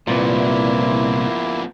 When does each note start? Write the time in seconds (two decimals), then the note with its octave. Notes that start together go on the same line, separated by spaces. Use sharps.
0.07 C2 A#2 F3 A#3 B3 E4